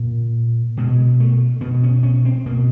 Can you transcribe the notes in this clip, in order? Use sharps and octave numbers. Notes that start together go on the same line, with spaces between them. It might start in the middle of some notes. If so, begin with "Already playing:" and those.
Already playing: A#2
B2 G#3
A3
B2 B3
C#4
C#4
C4
B2 A#3